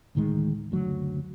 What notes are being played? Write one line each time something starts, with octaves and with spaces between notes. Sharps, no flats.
D2 A2 D#3 G#3
F#1 D2 F#3